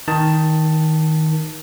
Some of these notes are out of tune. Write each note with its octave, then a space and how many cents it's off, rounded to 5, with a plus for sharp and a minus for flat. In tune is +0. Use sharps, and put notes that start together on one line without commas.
D#3 +15 A5 +10